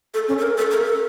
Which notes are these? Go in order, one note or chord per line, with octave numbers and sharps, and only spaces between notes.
A4
C#4
A4
A#4
A4
A#4
A4